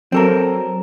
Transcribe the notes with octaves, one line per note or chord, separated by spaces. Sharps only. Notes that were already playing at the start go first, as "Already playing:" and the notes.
F#3 C4 A4 A#4